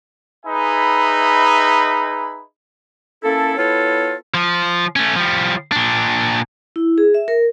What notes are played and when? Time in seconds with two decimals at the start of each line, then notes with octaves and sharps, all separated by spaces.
0.46 D#4 G#4 B4 E5 G#5 B5
3.22 A#3 C#4 E4 A4
3.56 B3 E4 F4 A4 C#5
4.34 F3
4.96 A3 C#4
5.16 F3 G3
5.72 A#2 D4
6.76 E4
6.98 G#4
7.14 E5
7.28 A#4